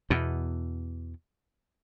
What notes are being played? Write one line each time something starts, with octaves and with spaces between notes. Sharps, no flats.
E2 B2